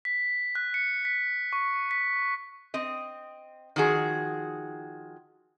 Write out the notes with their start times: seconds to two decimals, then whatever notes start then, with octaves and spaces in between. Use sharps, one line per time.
0.05 B6
0.55 F#6
0.74 C#7
1.05 B6
1.53 C#6
1.91 B6
2.74 C4 D#5
3.76 D#3 F3 F#4 G#4